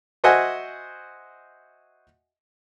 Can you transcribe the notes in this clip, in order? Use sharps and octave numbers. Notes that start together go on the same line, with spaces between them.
F#4 C5 D#5 E5 F#5 G#5